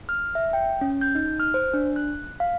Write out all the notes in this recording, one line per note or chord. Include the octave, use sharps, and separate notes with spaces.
F6
E5
G5
C#4
G6
D#4
F6
C5
D4
F#6
F5